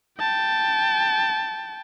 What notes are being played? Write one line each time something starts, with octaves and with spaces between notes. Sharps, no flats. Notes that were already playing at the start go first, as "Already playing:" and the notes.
G5 A5